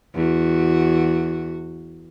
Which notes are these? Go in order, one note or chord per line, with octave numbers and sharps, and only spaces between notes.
E2 F#4